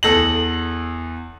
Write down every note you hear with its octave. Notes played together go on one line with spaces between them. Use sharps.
E2 A4 A#6 F#7